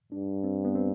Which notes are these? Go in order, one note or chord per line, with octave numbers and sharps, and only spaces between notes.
G2 D4
C4
B3
C4